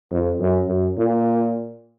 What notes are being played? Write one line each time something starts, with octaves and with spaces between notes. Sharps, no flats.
F2
F#2
F#2
A#2